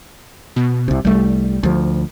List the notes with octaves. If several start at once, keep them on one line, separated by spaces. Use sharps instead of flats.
B2
C2 C3
C2 G3 A3
D2 F3